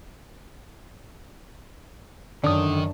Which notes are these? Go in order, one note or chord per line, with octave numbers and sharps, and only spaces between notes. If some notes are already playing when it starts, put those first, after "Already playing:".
F#2 D3 D#3 D4 D#6